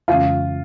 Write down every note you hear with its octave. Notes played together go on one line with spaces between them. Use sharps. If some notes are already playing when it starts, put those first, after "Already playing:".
F2 C#3 E3 G#3 C#4 F4